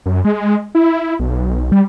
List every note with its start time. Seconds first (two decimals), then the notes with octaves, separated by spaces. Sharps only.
0.06 F#2
0.25 G#3
0.75 E4
1.20 B1
1.72 G3